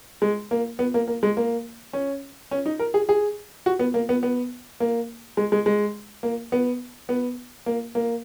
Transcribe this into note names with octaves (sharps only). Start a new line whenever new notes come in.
G#3
A#3
B3
A#3
A#3
G#3
A#3
C#4
C#4
D#4
A#4
G#4
G#4
F#4
B3
A#3
B3
B3
A#3
G#3
G#3
G#3
A#3
B3
B3
A#3
A#3